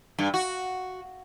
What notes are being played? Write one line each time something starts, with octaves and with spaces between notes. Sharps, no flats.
G2
F#4